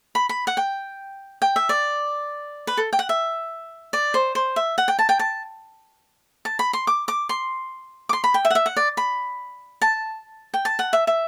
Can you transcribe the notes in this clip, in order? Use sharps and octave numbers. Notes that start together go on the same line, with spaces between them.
B5
B5
F#5
G5
G5
E5
D5
B4
A4
G5
F#5
E5
D5
C5
C5
E5
F#5
G5
A5
G5
A5
A5
B5
C6
D6
D6
C6
D6
C6
B5
G5
E5
F#5
E5
F#5
D5
B5
A5
G5
A5
F#5
E5
E5